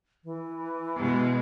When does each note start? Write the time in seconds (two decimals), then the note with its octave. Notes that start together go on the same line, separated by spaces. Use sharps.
0.24 E3
0.96 B2 G#3